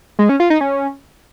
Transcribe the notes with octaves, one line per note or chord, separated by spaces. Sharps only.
G#3
C#4
F4
D#4
C#4